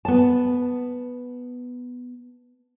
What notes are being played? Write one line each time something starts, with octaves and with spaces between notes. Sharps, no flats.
B3 A5